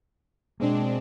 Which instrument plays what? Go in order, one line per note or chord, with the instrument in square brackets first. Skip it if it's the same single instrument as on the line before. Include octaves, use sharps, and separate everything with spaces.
[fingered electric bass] B2 A#3 [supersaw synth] G#3 C4 D4